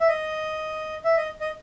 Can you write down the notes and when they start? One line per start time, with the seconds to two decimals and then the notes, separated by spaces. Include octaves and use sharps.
0.01 E5
0.08 D#5
1.05 E5
1.17 D#5
1.41 D#5